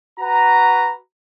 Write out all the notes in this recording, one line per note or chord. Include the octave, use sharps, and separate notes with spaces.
F#4 B4 A#5